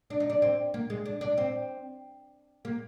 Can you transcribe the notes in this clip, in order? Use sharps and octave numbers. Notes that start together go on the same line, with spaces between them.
D4
D#4
D4
C4
A#3
G#3
D4
D4
C4
A#3